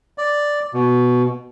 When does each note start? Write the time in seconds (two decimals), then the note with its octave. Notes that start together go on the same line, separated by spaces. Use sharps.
0.18 D5
0.74 B2